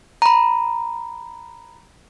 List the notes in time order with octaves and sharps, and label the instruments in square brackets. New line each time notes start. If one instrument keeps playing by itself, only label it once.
[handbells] A#5 B5